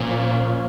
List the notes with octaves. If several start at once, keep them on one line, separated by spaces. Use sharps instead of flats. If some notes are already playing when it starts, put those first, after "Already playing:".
Already playing: A#2 F3 A#3 C#4